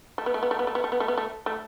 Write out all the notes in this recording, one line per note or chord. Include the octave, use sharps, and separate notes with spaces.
A3
B3
A3
B3
A3
B3
A3
B3
A3
B3
A3
B3
A3
A3